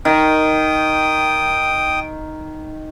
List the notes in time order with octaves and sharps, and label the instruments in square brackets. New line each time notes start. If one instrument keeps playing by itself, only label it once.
[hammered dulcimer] D#3 [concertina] G5 D#6